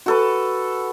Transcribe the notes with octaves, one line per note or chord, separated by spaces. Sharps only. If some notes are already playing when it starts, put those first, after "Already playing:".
F#4 A4 B4